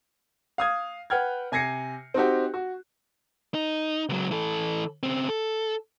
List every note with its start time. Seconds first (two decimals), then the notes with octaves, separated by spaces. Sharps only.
0.58 F5 D#6 G#6
1.10 B4 F#5 G5 F6 G#6
1.52 C3 G#5 G#6 A#6 C7 C#7
2.14 C4 D#4 F#4 G4
2.54 F#4
3.54 D#4
4.09 C#2 F#3
4.31 E3 A4
5.03 C#3 C4
5.29 A4